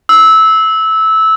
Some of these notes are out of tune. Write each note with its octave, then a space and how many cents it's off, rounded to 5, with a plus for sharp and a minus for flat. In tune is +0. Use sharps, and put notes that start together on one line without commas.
E6 -15